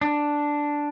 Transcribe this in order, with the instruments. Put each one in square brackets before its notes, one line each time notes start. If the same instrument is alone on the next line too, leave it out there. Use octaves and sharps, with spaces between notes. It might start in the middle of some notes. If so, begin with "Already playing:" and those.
[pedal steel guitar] D4